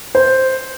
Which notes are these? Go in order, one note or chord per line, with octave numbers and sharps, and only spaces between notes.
C5